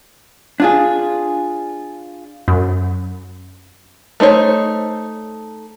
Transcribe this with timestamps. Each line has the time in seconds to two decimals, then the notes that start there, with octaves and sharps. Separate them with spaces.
0.60 D4 F4 G#4
2.48 F#2
4.20 A3 D#4 C5 C#5